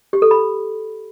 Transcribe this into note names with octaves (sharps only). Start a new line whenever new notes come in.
G4
A4
B5